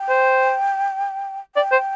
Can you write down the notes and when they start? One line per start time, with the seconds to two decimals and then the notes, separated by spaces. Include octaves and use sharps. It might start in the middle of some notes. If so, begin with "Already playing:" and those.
Already playing: G5
0.09 C5
1.55 D5 G5
1.72 C5